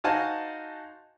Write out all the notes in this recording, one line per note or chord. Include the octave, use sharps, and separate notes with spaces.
D#4 F#4 C5 F5 G#5 A5